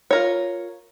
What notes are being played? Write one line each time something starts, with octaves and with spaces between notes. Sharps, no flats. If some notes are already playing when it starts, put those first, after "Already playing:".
F4 A#4 C#5